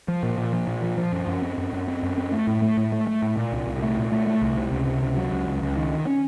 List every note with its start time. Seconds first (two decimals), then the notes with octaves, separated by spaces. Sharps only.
0.08 F3
0.23 A#2
0.38 A#2
0.53 F3
0.67 A#2
0.83 F3
0.97 F3
1.12 F#2
1.27 F#2
1.42 C4
1.58 F#2
1.73 F#2
1.88 C4
2.03 F#2
2.18 C4
2.32 A3
2.47 A2
2.62 A3
2.77 A2
2.92 A3
3.07 A3
3.22 A2
3.37 A#2
3.52 C2
3.67 C2
3.82 A3
3.97 A#2
4.12 A3
4.27 A3
4.42 C2
4.57 C3
4.72 C#2
4.87 C3
5.02 C#2
5.17 F#3
5.32 C#2
5.47 C#2
5.62 C#2
5.76 D#3
5.92 D#3
6.07 C#4